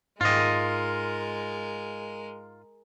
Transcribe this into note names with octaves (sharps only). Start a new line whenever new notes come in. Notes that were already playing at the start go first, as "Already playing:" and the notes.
G#2 G#3 F4 A#4 D#5